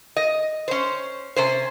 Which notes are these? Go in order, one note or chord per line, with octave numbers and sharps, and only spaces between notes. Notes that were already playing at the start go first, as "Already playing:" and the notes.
D#5
C#4 C5
C3 C#4 C5